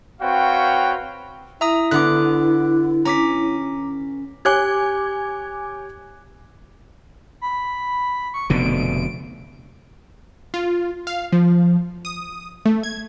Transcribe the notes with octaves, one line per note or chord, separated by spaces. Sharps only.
C4 F#4 B4 C#5 F5 G5
E4 E5 A#5 D#6
D3 B3 D6 F#6
C#4 A#5 D6 B6
G4 C#5 G#5 D6 F#6 G#6
B5
C#6
F1 B2 D3 D7
F4
F5
F3
D#6
A3
G#6